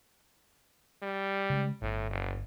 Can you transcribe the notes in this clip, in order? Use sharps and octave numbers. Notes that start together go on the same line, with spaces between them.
G3
C#3 G#3
G1 A2
F#1